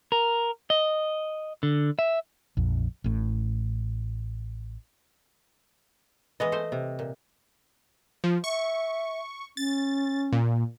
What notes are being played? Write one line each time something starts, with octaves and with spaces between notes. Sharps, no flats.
A#4
D#5
D3
E5
A#1 F2
A1 A2
E3 G#3 B3 D#5
A3 C5
C3
A#2
F3
E5 C#6
C#4 A6
A#2